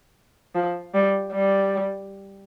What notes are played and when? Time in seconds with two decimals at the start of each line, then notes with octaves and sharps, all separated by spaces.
0.55 F3
0.94 G3
1.32 G3